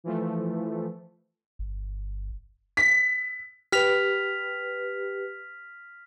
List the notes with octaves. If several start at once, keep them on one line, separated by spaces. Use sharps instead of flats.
E3 F3 A3
G1
B6
G4 B4 F6 B6 F7